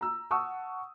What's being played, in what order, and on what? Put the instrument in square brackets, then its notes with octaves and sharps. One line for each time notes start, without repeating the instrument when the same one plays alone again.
[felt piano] A#5 E6
F#5 A5 C#6 D#6 E6